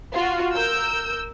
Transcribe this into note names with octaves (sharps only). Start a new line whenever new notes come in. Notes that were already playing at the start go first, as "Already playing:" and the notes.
F4 F#4
A#4 E6 G6